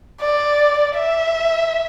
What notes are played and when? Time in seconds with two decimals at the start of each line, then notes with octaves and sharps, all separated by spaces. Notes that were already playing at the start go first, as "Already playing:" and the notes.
0.21 D5
0.96 E5